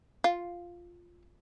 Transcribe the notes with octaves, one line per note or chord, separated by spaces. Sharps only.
F4